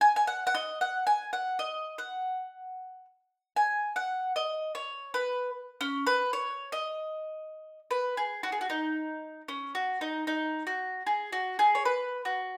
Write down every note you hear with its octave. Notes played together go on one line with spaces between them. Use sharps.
G#5
G#5
F#5
F#5
D#5
F#5
G#5
F#5
D#5
F#5
G#5
F#5
D#5
C#5
B4
C#4
B4
C#5
D#5
B4
G#4
F#4
G#4
F#4
D#4
C#4
F#4
D#4
D#4
F#4
G#4
F#4
G#4
C#5
B4
F#4